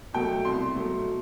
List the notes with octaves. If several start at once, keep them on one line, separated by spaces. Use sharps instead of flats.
B2 F#3 A3 G5
C2 C6
B2 F#3 A3